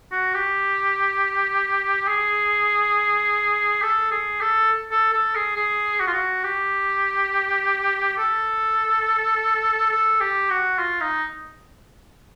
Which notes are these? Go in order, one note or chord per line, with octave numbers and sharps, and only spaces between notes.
F#4
G4
G#4
A4
G#4
A4
A4
A4
G#4
G#4
F#4
F4
F#4
G4
A4
A4
G4
F#4
F4
D#4